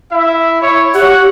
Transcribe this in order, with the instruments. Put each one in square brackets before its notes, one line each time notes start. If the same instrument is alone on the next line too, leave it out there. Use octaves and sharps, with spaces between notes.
[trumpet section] E4 E5
E4 C#5
[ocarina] G4 [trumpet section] C#5 F#5